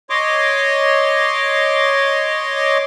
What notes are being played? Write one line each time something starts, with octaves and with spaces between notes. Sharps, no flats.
C#5 D#5 C6 D6